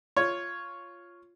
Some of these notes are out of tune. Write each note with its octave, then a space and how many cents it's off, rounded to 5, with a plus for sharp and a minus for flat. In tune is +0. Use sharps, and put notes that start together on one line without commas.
F4 +0 C#5 +0